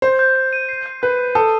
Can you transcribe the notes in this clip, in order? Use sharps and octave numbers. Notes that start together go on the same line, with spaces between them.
C5 G6
G6
G6
D#7
C7
G6
B4 G6
G6
A4 D#6